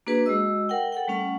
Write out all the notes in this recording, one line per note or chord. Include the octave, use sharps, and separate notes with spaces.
A#3 D4 F#4 G#4 B4
G#3 F#4 D#5 E6
A#4 F#5 G5
A4 F#5 G5
G3 A3 C#4 F#5